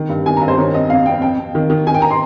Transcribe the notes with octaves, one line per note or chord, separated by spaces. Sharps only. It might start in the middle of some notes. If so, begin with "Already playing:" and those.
Already playing: D#3
G2
D#3 G#5
G2 A#5
C5
D#3 C#5
F2 D#5
F2 F5
F2 G5
F2 G5
F2
D#3
D#3
D#3 G#5
G5
A#5
C6